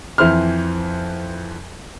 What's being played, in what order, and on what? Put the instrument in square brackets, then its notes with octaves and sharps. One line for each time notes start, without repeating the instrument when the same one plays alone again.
[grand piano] F2 E3 C5 F6